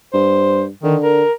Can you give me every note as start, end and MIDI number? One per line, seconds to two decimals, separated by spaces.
0.14 0.69 43
0.14 0.62 72
0.83 1.23 50
0.83 0.96 51
1.03 1.32 70